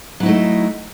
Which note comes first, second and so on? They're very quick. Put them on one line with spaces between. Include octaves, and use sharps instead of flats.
F#3 E4 D#4 A3